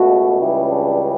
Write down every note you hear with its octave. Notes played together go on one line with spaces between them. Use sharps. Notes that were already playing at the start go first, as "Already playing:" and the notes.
Already playing: C#2 B2 A3 F#4
C#2 C#3 E3 G3 E4
D4